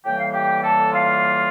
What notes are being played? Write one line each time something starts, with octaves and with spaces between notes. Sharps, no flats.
A2 E3 G3 A#3 G5
F5
G4 G5
A4 A5
F4 F5